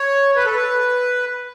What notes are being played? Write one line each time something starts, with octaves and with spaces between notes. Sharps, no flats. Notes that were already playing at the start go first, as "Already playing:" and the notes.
Already playing: C#5
B4
A4
B4